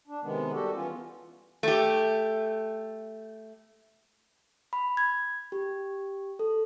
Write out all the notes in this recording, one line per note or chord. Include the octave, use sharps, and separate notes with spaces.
D4
C3 D#3 G#3 B3
G3 F#4 G4 A4
E3 B3 C#4 F4
A3 G4
B5
G#6
G4
A4